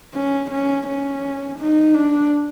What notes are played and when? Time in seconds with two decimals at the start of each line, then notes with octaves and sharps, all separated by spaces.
0.14 C#4
0.51 C#4
0.87 C#4
1.59 D#4
1.94 D4